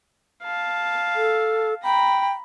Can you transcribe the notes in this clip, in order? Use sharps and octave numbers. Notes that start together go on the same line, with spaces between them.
F5 A5
A4
G5 A#5 B5